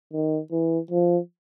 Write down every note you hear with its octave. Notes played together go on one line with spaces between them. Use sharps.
D#3
E3
F3